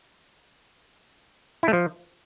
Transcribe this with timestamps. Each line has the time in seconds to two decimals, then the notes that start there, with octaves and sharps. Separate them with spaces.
1.63 E4
1.68 A3
1.73 F3